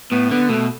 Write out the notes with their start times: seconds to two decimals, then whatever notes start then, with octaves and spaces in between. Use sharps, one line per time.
0.11 A2 B3
0.31 D3 B3
0.49 B2 A3